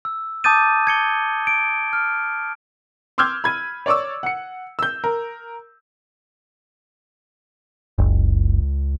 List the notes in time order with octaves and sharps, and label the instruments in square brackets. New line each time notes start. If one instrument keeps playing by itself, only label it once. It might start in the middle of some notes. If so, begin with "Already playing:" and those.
[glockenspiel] E6
A5 D6 D#6 G6 A6 D#7
G#6 C#7 G7
D7
F6
[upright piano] C6 D6 E6 F6 G6 G#6
B5 G#6 D#7
C#5 D5 C#6 D6 E6
F#5 C#7
E6 G6
A#4
[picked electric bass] F#1 [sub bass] C#2